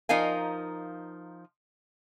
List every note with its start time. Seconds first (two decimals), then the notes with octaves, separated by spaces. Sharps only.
0.09 F3 D#4 A#4 F5 G#5